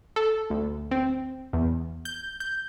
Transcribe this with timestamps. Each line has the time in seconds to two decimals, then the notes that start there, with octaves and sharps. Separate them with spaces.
0.16 A4
0.50 D2
0.91 C4
1.53 E2
2.05 G6
2.40 G6